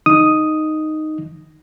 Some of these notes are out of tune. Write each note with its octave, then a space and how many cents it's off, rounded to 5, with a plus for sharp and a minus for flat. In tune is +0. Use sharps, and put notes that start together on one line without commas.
D#4 -5 D#6 +0